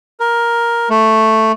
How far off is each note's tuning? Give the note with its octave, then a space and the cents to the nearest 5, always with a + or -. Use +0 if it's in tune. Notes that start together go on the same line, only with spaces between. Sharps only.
A#4 +10
A3 +5